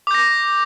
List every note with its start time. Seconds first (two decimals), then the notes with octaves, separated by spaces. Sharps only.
0.07 D6
0.11 G6
0.14 A#6